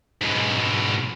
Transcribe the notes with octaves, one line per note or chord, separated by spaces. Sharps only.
G#2 B2